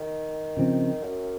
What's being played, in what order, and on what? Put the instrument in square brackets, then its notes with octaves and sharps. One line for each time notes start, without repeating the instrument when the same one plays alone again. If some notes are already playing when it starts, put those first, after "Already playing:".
Already playing: [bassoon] D#3
[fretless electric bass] C#3 F3 C4
[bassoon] F#2